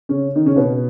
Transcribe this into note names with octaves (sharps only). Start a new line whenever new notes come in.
C#3 C#4
D#3 D#4
C#3 C#4
B2 B3